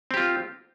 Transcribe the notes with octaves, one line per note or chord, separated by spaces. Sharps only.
C4 F4 G4